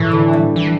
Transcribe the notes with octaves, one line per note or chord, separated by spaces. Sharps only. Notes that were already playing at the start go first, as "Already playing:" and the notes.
Already playing: A2 E3
D3
G3
E3